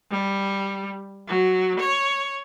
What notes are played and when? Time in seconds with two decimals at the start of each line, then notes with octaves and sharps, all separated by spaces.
0.11 G3
1.28 F#3
1.80 C#5